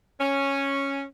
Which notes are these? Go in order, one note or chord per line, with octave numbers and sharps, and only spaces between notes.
C#4